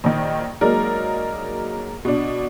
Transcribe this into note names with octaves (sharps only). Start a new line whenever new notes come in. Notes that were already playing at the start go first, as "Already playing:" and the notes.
A#1 D#3
F#3 G#3 A#3 D#4 A#4 D5
B2 D4